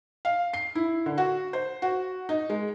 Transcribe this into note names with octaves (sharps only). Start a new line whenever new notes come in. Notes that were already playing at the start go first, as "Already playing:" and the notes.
F5
C7
E4
D3
F#4
C5
F#4
D#4
G#3